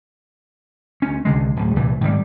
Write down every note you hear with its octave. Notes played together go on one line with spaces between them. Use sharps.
D2 C#4
C2 D3 G#3
D1
C2 A#2 E3
G#2 D#3 F3 G3